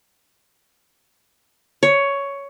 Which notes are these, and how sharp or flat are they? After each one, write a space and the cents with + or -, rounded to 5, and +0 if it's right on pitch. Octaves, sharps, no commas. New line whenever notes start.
C#5 +10